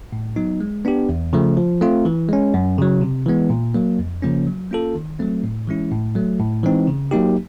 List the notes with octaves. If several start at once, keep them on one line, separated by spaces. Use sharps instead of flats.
A2
F#3 B3 D#4
G#3
B3 D4 G4
E2
C#3 F3 A3
F3
A3 C4 F4
E3
G#3 C#4
F#2
C#3 F#3
C3
E3 G#3 B3
A#2
F#3 A#3
F2
C#3 F3 A#3 C#4
F#3
A#3 C#4 F4 A4
D#3
F#3 A3 C4
A2
E3 G#3 C#4 E4
A2
F#3 A3
A2
E3 G#3 C4 D#4
C#3
F#3 A#3 D#4 G4